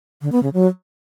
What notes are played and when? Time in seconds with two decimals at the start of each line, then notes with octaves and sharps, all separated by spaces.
0.22 D3
0.32 B3
0.43 C#3
0.53 F#3